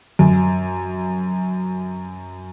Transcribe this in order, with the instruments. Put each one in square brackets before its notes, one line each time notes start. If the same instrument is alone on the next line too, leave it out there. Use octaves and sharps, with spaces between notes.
[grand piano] F#2